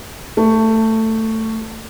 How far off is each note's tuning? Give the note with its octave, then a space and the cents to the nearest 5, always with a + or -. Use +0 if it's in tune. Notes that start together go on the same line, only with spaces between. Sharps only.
A3 +15